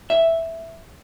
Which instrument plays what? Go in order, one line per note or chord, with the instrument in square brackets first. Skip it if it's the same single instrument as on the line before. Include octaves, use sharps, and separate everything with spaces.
[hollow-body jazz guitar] E5